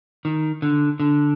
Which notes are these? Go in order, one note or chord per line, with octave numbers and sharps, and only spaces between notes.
D#3
D3
D3